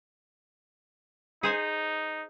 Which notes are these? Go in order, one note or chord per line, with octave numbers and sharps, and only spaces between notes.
D#4 G#4 C5 G#5